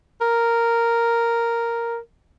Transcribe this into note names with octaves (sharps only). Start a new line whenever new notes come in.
A#4